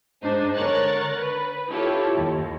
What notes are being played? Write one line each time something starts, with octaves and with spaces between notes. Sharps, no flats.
G#2 D4 D#4 C5
D3 A#4 C#5 F#6 A6
B4
E4 F4 G4 A4 C#5
D#2